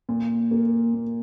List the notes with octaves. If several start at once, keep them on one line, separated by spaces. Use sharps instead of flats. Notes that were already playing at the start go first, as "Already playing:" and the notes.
A#2
A#3
A#2